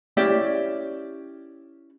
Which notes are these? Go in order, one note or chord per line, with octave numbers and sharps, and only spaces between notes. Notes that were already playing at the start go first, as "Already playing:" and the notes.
C#4 E4 G4 D5